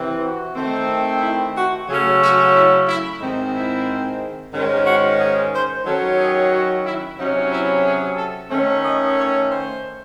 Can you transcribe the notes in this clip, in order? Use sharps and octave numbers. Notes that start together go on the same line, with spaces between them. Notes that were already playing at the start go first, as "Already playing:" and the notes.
Already playing: C3 E3 C4
F#4
D#3 A3 C4
E4
F#4
C#3 F#3 A3 C#4 G#4
F#4
E4
E4
G#2 D#3 G#3 C4 D#4
E4
G#2 D#3 G#3 C#4
F#4
G#4
C5
D#3 F#3 C#4 A4
G#4
F#4
E4
C3 F#3 C#4 D#4
E4
G#4
A4
D#3 A3 C#4
D#5
C#5
C5